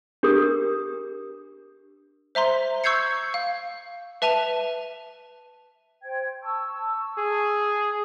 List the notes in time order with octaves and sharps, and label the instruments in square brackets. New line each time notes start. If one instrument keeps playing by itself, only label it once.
[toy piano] D4 G4 A#4 D#6
[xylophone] C5 E5 A#5 C6
C#6 E6 G6 G#6 C7 C#7
F5
B4 E5 A5 D#7 F7
[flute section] C5 G5 G#6
A5 C#6 E6
[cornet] G#4